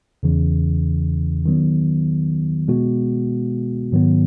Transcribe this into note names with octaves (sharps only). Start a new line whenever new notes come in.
E2 C#3 E3
D#3 F#3 B3
B2 G#3 B3 F#4
G#2 D#3 F#3 B3